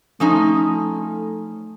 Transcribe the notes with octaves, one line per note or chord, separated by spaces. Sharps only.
F3 A3 C#4 D#4